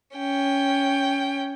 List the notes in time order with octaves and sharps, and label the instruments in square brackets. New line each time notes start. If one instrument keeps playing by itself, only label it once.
[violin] C#4 G5